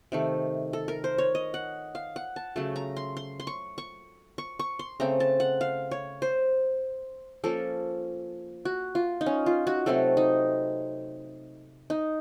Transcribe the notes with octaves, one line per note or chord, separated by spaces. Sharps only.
C3 D#3 A3
A4
A#4
C5
C#5
D#5
F#5
F5
F#5
A5
C#3 F#3 A3 A5
A#5
C6
C6
C6
C#6
C#6
C#6
C#6
C6
C#3 A3 C4 A#5
A5
F#5
F5
C#5
C5
F3 A#3 C#4 A4
F#4
F4
D#4
C#4
F4
F#4
C3 F#3 A3 C4 A4
D#4
D#4